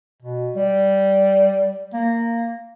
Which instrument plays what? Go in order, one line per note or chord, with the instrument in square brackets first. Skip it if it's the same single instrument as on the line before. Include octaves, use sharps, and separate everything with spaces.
[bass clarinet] B2
G3
A#3